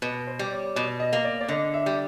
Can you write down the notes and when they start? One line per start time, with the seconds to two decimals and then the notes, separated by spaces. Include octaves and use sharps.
0.02 B2 B4
0.27 C5
0.39 G3
0.52 C#5
0.76 B2 D5
1.00 D#5
1.13 A#3
1.24 D5
1.41 D5
1.48 D3 D#5
1.74 E5
1.86 G3